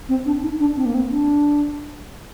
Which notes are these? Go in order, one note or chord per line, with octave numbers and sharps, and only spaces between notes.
C4
D4
D#4
D4
C4
A#3
C4
D4